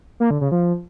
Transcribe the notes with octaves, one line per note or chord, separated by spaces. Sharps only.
A#3
D3
C#3
F3